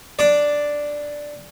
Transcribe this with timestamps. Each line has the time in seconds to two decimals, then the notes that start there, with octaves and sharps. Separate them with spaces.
0.19 D4 D5